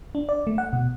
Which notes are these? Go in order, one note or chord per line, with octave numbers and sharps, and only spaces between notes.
D4
D5
A3
F#5
B2